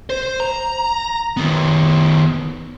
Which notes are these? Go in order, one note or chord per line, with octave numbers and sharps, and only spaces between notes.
C5
A#5
D#3 B3